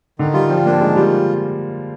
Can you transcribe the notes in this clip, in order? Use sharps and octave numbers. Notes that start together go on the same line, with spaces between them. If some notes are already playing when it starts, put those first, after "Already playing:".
D3 D#3
G3 F4
F3 G3
A#3 D4
D#3 G#3
G3 F4